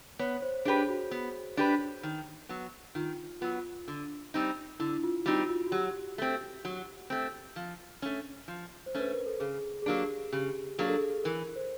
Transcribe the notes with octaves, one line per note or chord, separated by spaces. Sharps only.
B3 C#5
C5
D4 G4 G#4 B4
F#4
B3
D4 G4 B4
D#3
F#3 B3
D#3 F4
F#3 B3 F4
D3
G3 C4 D#4
D3 E4
F4
G3 C4 D#4 F#4
F4
F#4
F#3 G4
A3 C4
F#3
A3 C4
F3
A3 C#4
F3
C5
A3 C#4 B4
A#4
A4
C#3 G#4
G#4
F#3 A#3 D4 G4
C#3 G4
F#3 A#3 D4 G#4
A4
G#4
E3 A#4
C5